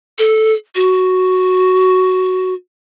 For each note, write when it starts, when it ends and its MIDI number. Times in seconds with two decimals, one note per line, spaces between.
0.19 0.54 69
0.75 2.54 66